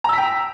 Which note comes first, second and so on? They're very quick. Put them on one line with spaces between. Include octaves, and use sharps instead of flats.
A#5 E6 B6 G5